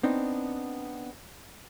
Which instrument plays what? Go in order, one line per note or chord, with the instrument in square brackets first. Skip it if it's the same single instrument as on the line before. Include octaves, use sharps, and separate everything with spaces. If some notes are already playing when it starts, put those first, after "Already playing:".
[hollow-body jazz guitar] B3 C4 D4 D#4